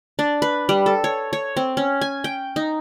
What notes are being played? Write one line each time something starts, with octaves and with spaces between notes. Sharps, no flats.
D4
B4
G3
A4
C#5
C#5
C4
C#4
G#5
G5
D#4